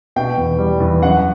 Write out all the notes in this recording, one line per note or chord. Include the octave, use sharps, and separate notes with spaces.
B2 G5
E2
G3
E2
F#2 F#5